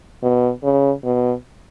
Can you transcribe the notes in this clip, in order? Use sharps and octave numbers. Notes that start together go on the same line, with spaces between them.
B2
C#3
B2